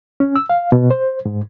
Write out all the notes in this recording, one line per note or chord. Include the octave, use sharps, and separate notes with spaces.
C#4
E6
F5
B2
C5
G#2